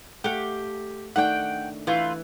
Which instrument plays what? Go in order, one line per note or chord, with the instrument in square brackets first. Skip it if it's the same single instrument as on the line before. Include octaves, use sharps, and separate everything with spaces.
[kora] A3 F5 F#5 [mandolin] G4
[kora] D#3 A3 D4 [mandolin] F#5 G5
[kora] E3 [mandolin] A3 F4 B4